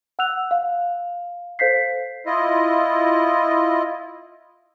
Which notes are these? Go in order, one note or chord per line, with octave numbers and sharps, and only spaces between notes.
F#5 E6 F#6 F7
F5
A4 C5 F5 G6 B6 C7
E4 F4 D#5